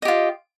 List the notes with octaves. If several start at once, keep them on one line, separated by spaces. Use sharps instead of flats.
F4 G4 D#5